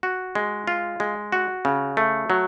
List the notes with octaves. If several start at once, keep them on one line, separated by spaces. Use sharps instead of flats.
F#4
G#3
F4
G#3
F#4
C#3
A3
F#3